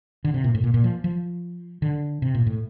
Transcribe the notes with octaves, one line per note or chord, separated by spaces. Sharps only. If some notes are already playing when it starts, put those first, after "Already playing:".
D3
C3
A#2
A2
A#2
A#2
F3
F3
D3
C3
A#2
A2